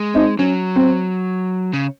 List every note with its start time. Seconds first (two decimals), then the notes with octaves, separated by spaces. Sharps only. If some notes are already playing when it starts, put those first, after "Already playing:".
Already playing: G#3
0.14 C4 D#4
0.39 F#3 C#4
0.76 C4
1.73 C#3